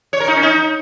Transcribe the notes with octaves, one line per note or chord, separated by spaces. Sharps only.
C#5
A#4
D#4
C#4
D#4